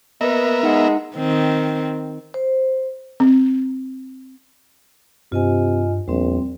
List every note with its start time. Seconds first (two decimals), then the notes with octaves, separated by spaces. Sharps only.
0.21 A#3 B3 A#4 B4 D#5 E5
0.63 G#3 D#4 F#5
1.15 D#3 C4
2.34 C5
3.20 C4
5.32 G2 C3 F4 D#5 G#5
6.08 A#1 E2 G3 C4